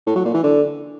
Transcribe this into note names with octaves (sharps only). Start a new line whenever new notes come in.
A2
F#3
A#2
E3
D3